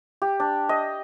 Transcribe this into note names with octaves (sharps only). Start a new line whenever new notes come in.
G4
D4
D#5